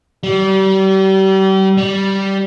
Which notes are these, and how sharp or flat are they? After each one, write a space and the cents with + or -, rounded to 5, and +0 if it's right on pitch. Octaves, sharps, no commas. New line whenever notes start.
G3 -35
G3 -10